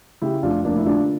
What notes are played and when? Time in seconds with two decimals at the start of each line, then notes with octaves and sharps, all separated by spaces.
0.22 C#3 E4 G4
0.43 F1 D4 F4
0.64 F1 A#3 D4
0.77 E4
0.86 D3 D4 F4